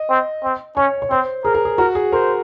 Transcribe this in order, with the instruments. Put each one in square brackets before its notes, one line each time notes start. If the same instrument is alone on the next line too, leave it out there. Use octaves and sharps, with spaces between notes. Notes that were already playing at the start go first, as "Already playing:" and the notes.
Already playing: [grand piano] D#5
[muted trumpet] C4
C4
[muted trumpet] C#4 [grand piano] C#5
[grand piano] C#5
[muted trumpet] C4 [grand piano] C5
[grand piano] G#4 [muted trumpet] A#4
[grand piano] A#4
G#4
[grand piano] F#4 [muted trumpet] A#4
[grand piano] G#4
[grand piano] A#4 [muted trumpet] C5